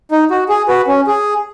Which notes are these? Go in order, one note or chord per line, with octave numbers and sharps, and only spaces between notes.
D#4
F#4
G#4
F#4 B4
C#4
G#4